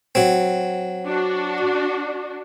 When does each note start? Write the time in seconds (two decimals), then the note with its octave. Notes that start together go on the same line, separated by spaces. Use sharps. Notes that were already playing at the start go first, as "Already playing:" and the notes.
0.15 F#3 C4
1.06 D4 F#4